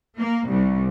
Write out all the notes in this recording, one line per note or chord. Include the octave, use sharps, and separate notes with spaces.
A#3
C2